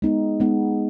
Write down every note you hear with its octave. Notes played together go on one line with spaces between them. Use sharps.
G#3 B3 D#4
G#3 B3 D#4